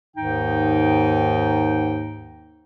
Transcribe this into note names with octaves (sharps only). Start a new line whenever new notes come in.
D#2 G#2 D#3 D#4 G5